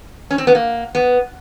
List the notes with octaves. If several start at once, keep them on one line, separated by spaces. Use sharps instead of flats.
C#4
C4
B3
A#3
B3